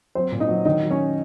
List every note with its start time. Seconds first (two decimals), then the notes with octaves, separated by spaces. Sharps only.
0.15 F#3 C4 C5
0.32 A#2
0.40 D#4 D#5
0.48 F#3
0.65 D#3 D#4 D#5
0.82 F#3
0.91 C#4 C#5